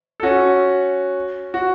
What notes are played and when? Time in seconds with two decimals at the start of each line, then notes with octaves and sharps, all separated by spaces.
0.20 A4
0.23 C#4 F#4
1.54 F#4